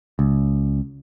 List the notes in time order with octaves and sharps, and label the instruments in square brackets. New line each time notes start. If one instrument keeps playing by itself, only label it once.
[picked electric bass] C#2